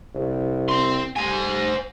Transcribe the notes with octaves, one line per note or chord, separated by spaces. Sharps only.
C2
C4 C6
G3 C5 G#5